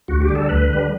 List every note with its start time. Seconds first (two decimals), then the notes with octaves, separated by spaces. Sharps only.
0.08 D2 F#4
0.22 G4
0.28 D3 G3
0.35 A4
0.49 D2 B4
0.70 D3 G3